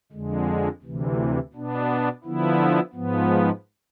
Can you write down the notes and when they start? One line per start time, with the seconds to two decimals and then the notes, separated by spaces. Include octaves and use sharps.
0.12 F2 D3 G#3
0.82 D2 C3 E3
1.53 B2 B3 D4
2.24 D3 F3 B3 E4
2.93 G#2 F3 B3